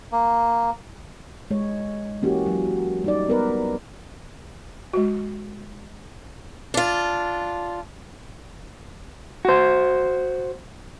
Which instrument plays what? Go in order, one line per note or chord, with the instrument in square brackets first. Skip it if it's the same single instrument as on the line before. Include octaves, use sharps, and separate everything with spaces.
[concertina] A#3
[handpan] G#3 C#5
E3 A#3 C#4 F#4 G4
F#3
G3 D#4 D5
B3 A#4 B4
[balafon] G#3 F#4
[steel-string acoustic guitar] D4 F4
[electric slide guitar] F#4 C5